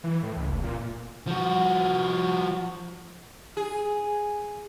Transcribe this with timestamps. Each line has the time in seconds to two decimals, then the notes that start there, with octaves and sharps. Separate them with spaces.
0.04 E3
0.23 A2
0.36 C#2
0.50 F1
0.63 A#2
1.27 F3 F#4
3.57 G#4